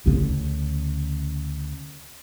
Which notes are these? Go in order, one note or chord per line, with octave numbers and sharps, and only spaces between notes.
D2 C#3